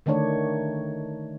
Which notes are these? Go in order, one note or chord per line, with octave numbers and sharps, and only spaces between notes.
D3 D#3 A3 D4 C#5